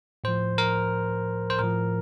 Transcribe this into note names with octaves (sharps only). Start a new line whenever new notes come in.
A2 F3 C5
A#4
C5
A2 F3 A#4